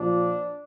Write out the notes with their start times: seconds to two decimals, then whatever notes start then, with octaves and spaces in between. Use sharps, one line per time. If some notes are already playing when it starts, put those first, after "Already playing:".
Already playing: A#2 F3 D4